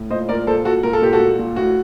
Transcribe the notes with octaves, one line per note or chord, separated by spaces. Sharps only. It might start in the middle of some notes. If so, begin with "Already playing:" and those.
Already playing: A2
A#2 C5 D#5
A#2 A#4 D5
A#2 A4 C5
A#2 F#4 A4
A#2 A#4
A4
A#2 G4
F#4 A4
A#2
A#2
A2 F#4